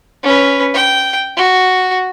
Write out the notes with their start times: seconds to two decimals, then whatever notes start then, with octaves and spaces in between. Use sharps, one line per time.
0.23 C#4 B4
0.74 G5
1.37 F#4